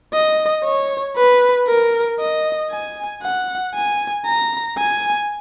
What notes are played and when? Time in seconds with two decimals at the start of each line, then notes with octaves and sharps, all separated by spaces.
0.13 D#5
0.65 C#5
1.17 B4
1.68 A#4
2.19 D#5
2.71 G#5
3.23 F#5
3.75 G#5
4.26 A#5
4.78 G#5